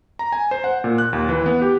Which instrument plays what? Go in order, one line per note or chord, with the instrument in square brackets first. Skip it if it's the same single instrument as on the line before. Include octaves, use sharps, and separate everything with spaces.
[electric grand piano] A#5
G#5
C5
F#5
A#2
F#6
D#2
E3
B3
G4